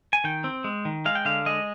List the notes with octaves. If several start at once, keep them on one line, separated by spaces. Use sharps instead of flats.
G#5
D#3 G5
C4
G#3
D#3
G#3 F5
G5
D3 F5
G#3 D#5